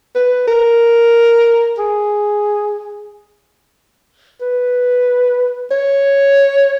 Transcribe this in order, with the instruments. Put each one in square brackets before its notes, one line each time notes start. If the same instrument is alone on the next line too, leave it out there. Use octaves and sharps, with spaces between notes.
[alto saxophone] B4
A#4
G#4
B4
C#5